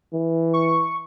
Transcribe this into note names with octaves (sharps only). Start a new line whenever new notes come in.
E3
C#6